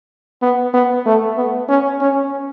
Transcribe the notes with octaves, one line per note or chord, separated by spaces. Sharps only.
B3
B3
A3
B3
C#4
C#4